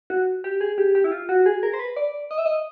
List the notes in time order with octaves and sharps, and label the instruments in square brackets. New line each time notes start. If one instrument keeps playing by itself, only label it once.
[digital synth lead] F#4
G4
G#4
G4
G4
E4
F4
F#4
G#4
A#4
C5
B4
D5
D#5
E5
D#5